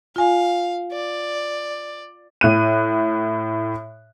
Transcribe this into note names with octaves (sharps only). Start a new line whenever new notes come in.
F4 F5 G#5
D5
A2 F#6 D#7